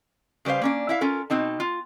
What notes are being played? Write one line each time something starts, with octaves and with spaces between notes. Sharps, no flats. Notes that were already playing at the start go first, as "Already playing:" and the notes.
C#3 G3 B4 C5 F5
A#3 C#4 D4
E4 E5 F5
C#4 F4 A4 A#4
B2 C4 D#4 A5
F4